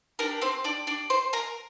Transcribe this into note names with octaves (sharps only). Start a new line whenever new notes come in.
D4 G4 A#4
C4 C5
D4 D5
D4 D5
C5 C6
A#4 A#5